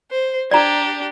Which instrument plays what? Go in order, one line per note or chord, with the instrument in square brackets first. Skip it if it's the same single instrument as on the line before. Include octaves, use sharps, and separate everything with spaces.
[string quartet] C5
[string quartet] D4 G4 [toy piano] D5 A#5